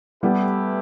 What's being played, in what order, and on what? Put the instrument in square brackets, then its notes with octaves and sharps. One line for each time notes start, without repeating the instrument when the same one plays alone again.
[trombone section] E3 A3 E4 G4 B4 [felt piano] G3 B3